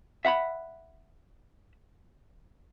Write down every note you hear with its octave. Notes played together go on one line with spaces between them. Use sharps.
E5 F#5 A#5 B5